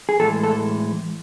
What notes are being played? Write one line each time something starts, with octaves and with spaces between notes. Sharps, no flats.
G#4
A2 E3 G#3 A4
A4